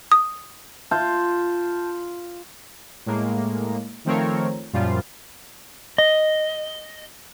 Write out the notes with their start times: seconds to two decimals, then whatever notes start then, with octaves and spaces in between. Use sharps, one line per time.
0.12 D#6
0.91 F4 F5 A5 G6
3.06 A2 G#3 A#3
4.05 D#3 F3 A3 C4 A#4 C#5
4.73 F#2 A#2 F3 G3 F4
5.98 D#5